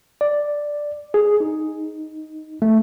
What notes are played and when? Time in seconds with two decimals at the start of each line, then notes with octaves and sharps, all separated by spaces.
0.21 D5
1.14 G#4
1.40 D#4
2.62 A3